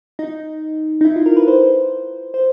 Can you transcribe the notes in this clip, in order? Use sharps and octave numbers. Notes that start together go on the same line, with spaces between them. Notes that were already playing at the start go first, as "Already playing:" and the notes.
D#4
D#4
E4
F4
A#4
B4
C5
C5